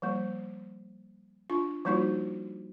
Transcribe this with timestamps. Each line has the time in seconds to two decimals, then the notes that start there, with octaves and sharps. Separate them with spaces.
0.02 F3 G3 A#3
1.50 D4 F4 C#6
1.85 F3 G3 A#3 D#4 F4 F#4